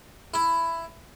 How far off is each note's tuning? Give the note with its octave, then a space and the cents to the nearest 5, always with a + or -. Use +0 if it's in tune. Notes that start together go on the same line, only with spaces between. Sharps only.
E4 +10